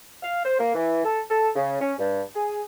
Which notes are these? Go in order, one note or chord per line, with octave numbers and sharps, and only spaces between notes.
F5
C5
A#3
E3
A4
A4
C#3
C#4
G2
G#4